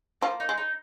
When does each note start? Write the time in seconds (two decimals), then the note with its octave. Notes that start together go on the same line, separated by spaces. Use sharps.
0.21 F3 A#3
0.40 D#4
0.49 G#3
0.57 D#4